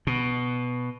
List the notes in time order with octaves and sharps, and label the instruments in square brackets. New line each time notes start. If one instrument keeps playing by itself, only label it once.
[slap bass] B2